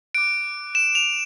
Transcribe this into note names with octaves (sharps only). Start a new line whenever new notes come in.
D6 F#6 D7
E7
F7